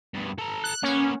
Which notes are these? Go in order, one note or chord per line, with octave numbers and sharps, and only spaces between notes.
G2 B2
A4 A#5
F#6
A#3 B3 C#4